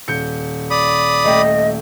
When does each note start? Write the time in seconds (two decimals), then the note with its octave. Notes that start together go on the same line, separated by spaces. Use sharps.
0.08 D#1 G6 C#7
0.71 D5 B5 D#6
1.24 D#1 A3 D#5 G5